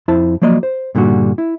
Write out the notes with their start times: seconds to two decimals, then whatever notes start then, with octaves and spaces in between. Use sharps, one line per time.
0.08 F2 E4 C5 A5
0.42 F3 F#3 A#3 D5 D#5
0.63 C5
0.95 G2 A#2 D3 G3 F#4
1.38 E4